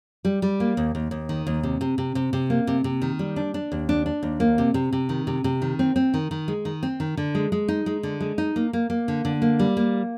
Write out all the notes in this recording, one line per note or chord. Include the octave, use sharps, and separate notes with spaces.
G3
G3
A#3
D#2
D#2
D#2
D#3
D#2
C3
C3
C3
C3
C3
A#3
C3
C3
D#3
G3
D4
D4
D#2
D4
D4
D#2
A#3
C3
C3
C3
D#3
C3
C3
D#3
C4
C4
D#3
D#3
G#3
D#3
C4
D#3
D3
G#3
G#3
D#4
G#3
D3
G#3
D#4
A#3
A#3
A#3
D3
D3
A#3
G3
A#3